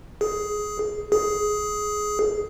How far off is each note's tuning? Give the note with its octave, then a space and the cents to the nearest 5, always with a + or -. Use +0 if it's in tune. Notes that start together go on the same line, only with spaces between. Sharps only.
G#4 +10
G#4 +10